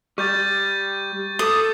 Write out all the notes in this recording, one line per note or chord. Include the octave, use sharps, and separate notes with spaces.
G3 C#6 G6 A6
A4 D6 D#6